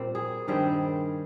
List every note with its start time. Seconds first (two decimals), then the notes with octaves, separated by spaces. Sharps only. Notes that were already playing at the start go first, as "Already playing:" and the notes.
Already playing: A#2 G3 C4
0.15 G#4
0.47 G2 D#3 G3 C4 G#4